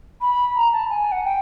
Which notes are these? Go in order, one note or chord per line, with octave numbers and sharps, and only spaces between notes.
B5
A#5
A5
G#5
F#5
G5